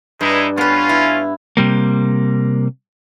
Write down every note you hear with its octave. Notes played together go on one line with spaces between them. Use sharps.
G2 G#3 D#4 E4
B3 C#4 F4 B4
E4
C3 G3 A#3